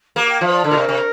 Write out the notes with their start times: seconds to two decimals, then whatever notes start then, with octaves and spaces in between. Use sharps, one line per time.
0.16 A#3 G4
0.29 G5
0.41 F3 F5
0.47 C5
0.53 D5
0.64 D3 A#4
0.71 A#2
0.77 C3
0.89 C3